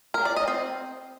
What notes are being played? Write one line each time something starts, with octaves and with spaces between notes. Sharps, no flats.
A#4
D5
D#5
C4